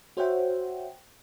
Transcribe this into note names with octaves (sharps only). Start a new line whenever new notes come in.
F#4 C5 C#5 E5 F#5 G5